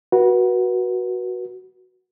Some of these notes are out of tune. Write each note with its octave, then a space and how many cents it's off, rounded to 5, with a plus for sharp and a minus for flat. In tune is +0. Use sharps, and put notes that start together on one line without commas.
F#4 +0 B4 -35